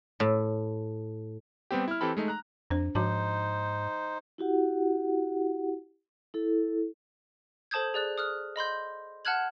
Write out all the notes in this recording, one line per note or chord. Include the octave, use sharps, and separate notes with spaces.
A2
G3 B3 C4 G4
E4 F6
E3 C4 G4 A4 B5
G#3 A3 D#4
A#5 F#6
F2 D4 C5
G#2 F3 D#4 F#4 C5 A5
E4 F#4 G4 F#5
E4 A4
A4 C5 A5 D#6 G6 G#6
G#4 D5 F#6
D#6 F6 F#6
D#5 B5 C6 G6
F#5 A5 F6 F#6 G#6 F#7